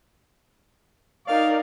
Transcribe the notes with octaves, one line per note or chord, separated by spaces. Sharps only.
D#4 A#4 D5 F5